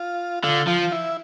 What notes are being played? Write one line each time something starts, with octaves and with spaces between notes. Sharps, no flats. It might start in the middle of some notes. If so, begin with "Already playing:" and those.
Already playing: F4
D3 F4
F3 F4
E4